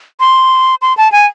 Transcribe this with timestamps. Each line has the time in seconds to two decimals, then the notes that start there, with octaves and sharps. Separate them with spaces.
0.20 C6
0.82 C6
0.97 A5
1.12 G#5